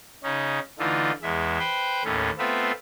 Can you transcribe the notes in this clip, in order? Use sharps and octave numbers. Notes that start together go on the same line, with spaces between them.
C#3 C#4 D#4
D3 E3 A3 D#4 F4
E2 G#3 E5
B4 C5 G5
D#2 A2 A3 C#4
A3 B3 C4 F4 E5